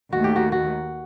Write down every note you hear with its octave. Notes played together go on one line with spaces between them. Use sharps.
D#2 D#3 A3 F#4
G4
F#4
F#4